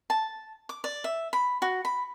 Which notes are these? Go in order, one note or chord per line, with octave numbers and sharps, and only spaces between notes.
A5
D6
D5
E5
B5
F#4
B5